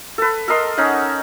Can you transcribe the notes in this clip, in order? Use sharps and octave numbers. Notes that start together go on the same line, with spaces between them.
A4 B4
A4 A#4 D#5 C6
C#4 D#4 F#5